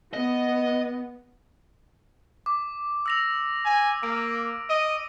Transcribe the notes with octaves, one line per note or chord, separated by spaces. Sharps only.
B3 D#5
D6
E6 A#6 F7
G#5
A#3 D7
D#5 D#7